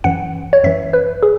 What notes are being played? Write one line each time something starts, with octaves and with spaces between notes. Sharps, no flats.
F#2 E3 F#5
C#5
F#2 E3 E5
B4
G#4